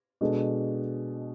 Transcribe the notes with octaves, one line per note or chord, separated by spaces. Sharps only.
B2 G#3 D4 A4